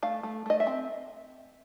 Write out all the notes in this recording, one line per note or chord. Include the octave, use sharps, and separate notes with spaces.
A3 F5
A3
A3 D#5
E5
C4